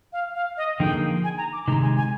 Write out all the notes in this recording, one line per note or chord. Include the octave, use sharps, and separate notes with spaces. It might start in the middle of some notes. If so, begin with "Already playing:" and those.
F5
F5
D#5
D3 F3 A#3 D#4 G#4 G5
G#5
A#5
D6
C3 D#3 G#3 D#4 A#5
G#5
G#5